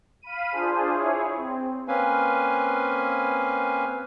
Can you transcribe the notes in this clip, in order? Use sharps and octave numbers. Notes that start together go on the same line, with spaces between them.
F5 B5 D#7
D4 F4 G#4 C5
E4 G#4 C#5
C4
A#3 C4 C#4 B4 F5 G#5